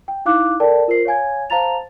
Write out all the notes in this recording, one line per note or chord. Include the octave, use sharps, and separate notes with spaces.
G5
D#4 E4 F5 D6 F#6
A4 A#4 D5 G5 A5
F4 A#4 C5 C7
C#5 F5 G#5 G#6
C5 F5 A5 A#5 A6 F7